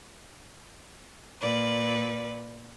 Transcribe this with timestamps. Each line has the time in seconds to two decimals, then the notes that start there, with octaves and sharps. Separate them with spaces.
1.41 A#2 B4 D5